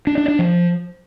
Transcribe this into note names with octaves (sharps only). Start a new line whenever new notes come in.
D4
D4
D4
F3